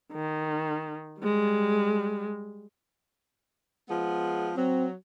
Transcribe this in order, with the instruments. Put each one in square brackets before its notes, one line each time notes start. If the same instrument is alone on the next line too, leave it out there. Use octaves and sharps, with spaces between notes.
[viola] D#3
G3 G#3
[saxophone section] F3 G#3 B3
[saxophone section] F#3 [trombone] C4